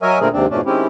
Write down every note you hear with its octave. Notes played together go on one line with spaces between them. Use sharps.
F#3 A#4 C#5 D#5 E5 G#5
A#2 D3 A3 C4 G#4 A#4
D#2 G#2 C3 C4 D4
F2 G#2 B2 A3 C#4 D4
D#3 G#3 C4 C#4 E4 G4